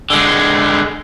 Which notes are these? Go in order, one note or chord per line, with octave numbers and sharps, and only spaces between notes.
D3 G#3